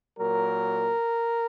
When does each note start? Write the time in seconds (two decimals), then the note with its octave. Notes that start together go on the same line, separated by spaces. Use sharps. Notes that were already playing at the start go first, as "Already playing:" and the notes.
0.17 A#2 F#3 A#4